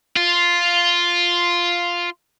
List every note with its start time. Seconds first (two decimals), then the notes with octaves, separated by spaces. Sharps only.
0.16 F4